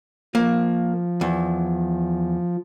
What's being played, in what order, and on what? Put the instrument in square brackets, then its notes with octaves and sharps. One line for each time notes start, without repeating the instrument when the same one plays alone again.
[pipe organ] F3 [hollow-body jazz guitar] A#3
[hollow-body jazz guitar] E2